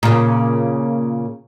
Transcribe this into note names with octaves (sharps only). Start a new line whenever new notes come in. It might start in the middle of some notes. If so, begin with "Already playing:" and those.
A#2 C#3